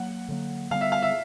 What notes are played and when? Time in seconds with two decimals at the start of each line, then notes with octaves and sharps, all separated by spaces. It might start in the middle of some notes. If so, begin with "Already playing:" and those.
Already playing: F#3 A#3 F#5
0.29 D3 F#3 A#3
0.71 D3 G3 B3 F5
0.81 E5
0.92 F5
1.03 E5